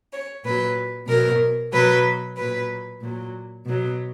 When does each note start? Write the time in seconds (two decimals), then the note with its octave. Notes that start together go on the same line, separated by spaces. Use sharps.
0.13 C#5
0.44 A#2 F#3 B4
1.08 B2 F#3 A#4
1.73 B2 F#3 B4
2.37 A#2 F#3 B4
3.01 A#2 F#3
3.65 B2 F#3